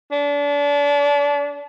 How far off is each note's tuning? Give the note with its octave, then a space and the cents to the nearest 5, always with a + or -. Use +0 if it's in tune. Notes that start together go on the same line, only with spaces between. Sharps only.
D4 -35